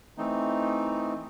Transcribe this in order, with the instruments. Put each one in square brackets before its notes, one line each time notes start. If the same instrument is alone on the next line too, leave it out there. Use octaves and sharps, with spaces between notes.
[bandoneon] E3 A3 C4 D#4